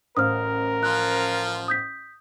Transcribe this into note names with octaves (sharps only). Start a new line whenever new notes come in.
A1 A#4 C5 F5 D#6 F6
F3 F4 F#6
D#6 G6 B6